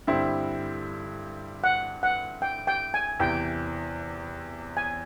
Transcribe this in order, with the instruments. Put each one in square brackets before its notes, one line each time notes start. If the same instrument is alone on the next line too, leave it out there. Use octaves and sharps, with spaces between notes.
[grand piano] G2 D3 G3 C4 E4
[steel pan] F#5
F#5
G5
G5
G#5
[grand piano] E2 C3 E3 [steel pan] G5
[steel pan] G#5